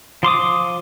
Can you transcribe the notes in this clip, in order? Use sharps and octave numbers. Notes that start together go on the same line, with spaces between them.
F3 C6 D6 D#6